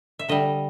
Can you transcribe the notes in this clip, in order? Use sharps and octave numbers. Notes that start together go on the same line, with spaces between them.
E5
D3 G3 D#5